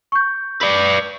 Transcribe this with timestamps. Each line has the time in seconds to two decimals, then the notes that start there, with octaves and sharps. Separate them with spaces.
0.12 C#6 G6
0.61 B4 D5